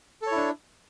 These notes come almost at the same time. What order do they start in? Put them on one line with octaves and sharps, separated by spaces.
A4 C#5 E4 D4